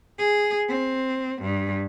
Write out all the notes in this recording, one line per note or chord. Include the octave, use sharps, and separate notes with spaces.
G#4
C4
G2